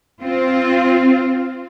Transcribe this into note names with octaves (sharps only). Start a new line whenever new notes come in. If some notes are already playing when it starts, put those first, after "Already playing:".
C4 F4